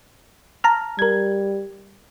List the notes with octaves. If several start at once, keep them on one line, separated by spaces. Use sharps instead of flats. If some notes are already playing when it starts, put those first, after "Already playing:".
A5 A#5 F6
G3 A#4 G#6